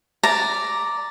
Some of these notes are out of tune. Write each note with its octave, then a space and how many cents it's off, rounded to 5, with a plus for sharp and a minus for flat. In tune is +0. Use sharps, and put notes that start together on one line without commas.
D5 +0 A#5 +0